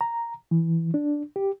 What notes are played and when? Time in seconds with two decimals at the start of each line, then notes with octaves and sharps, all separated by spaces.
0.01 A#5
0.51 E3
0.94 D4
1.36 G4